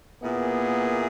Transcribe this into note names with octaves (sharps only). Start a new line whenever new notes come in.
A#2 A#3 B3 E4 G#4